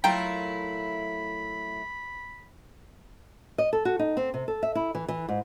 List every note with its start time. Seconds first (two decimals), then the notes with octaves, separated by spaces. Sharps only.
0.04 F#3 A3 E4 F4 A#4 G5 B5
3.58 D#5
3.73 A4
3.85 F#4
3.99 D#4
4.17 C4
4.34 C3
4.48 A4
4.63 E5
4.75 E4
4.95 E3
5.08 E3
5.29 G#2